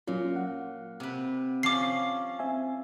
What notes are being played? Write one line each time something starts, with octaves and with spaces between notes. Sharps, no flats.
A#2 F#3 C#4 F4
F#5
C3 B4
F3 C#4 D6 C7
C4 E5 G#5